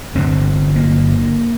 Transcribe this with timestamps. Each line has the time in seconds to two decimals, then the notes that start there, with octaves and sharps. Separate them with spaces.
0.15 G1 G2 D3 C4
0.76 A#3